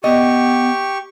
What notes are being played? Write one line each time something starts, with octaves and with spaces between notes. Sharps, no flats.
B3 G4 D#5 C#6